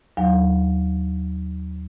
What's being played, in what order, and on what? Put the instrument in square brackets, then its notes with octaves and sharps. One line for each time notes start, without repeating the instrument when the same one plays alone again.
[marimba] D#2 F#3 F5